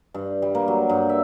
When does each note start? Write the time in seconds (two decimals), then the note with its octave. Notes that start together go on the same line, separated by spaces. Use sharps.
0.14 G2
0.42 G3
0.55 A#3
0.68 F#3
0.89 G2
1.09 E5